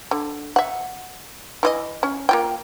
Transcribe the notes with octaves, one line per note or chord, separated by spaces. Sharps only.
D3
E5 F#5
E3 E4 D#5
C#4
A#3 F4 G5